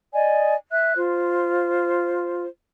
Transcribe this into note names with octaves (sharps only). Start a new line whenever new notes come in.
D5 D#5 G#5
E5 F#6
F4 C5